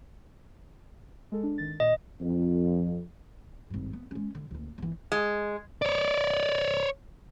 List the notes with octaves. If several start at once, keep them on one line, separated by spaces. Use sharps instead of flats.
G#3 A4
D4
G#1 D#3 A6
A#2 D#5
F2
G#1 G2
B3
G#3 C#4
D3
F#1 D2
G1 E3
G#3
C#5 D5